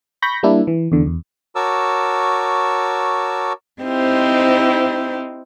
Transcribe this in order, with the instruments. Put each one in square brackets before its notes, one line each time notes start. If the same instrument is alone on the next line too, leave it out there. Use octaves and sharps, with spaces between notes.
[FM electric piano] B5 C#6 G6 A#6
G3 A#3 D4 E4
E3
E2 D3
E2
[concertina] F#4 A#4 C#5 A5 D6 E6
[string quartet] C4 D#4 E4 G4 C5